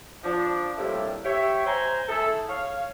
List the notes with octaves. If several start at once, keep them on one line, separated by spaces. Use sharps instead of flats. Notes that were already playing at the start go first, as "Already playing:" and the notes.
F3 D4
A2 C3 G3 A#3 D4 E5
G4 C#5 E5
C5 G#5 A#5
A3 E4 G#4 A4
C#5 F5